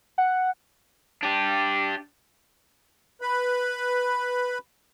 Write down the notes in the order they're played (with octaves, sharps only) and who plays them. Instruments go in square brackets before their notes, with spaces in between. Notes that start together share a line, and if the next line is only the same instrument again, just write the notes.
[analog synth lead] F#5
[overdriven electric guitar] D4 G4
[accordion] B4 B5